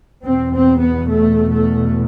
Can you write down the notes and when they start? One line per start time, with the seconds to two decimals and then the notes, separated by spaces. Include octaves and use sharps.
0.24 E2 B2 C4
0.53 C4
0.80 B3
1.09 A3
1.52 A3